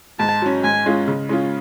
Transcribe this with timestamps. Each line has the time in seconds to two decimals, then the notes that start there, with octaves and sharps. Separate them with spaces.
0.19 G#2 A5
0.42 F#3 C#4
0.64 G#2 G#5
0.86 G#3 C#4 F4
1.08 C#3
1.29 G#3 C#4 F4